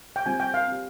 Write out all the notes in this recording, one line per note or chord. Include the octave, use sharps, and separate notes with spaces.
G5
G3 C4 F4 G#5
G5
F5
C4 G4